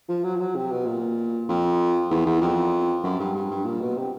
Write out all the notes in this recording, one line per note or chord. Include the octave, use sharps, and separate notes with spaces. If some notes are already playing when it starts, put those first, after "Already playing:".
F3
F#3
F3
F#3
C3
B2
A#2
F2
E2
E2
F2
F#2
G2
G2
G2
A#2
B2
C3